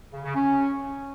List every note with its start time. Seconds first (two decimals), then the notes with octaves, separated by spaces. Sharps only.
0.13 C#3
0.24 C#3
0.35 C#4